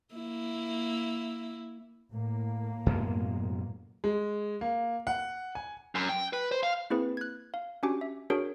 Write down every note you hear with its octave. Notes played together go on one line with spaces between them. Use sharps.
A#3 E4
A2 A#3
F#2 B2 G#3
G#3
A#3
F#5
G#5
F#2
G5
B4
C5
F5
A#3 C4 E4 G#4 B4
F#6 G#6
F5
C#4 D4 F#4 G4 G#5 D6
E5
D4 F#4 G#4 A#4 C#5 D7